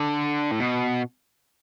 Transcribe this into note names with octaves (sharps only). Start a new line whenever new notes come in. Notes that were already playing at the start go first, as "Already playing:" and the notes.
Already playing: D3
A2
B2